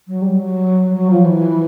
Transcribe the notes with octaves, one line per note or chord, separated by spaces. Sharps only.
F#3
G3
F#3
F#3
F3
E3